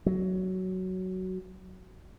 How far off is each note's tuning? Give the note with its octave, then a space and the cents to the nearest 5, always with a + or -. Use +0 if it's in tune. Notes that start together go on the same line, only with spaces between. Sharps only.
F#3 +10